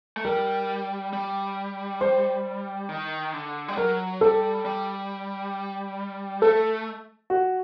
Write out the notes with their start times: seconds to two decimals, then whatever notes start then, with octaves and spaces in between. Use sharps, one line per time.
0.17 A3
0.25 G3 A#4
1.13 G3
2.01 C5
2.89 D#3
3.33 D3
3.68 G3
3.77 F#3 A#4
4.21 G3 A4
4.65 G3
6.42 A3 A4
7.30 F#4